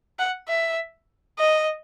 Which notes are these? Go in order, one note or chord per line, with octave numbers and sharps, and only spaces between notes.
F#5
E5
D#5